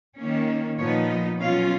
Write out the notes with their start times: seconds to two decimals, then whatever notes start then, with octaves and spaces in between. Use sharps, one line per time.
0.17 D#3 A#3 C#4
0.78 A#2 F3 B3 D#4 C#5
1.09 D#5
1.40 B2 F#3 C#4 F4 F5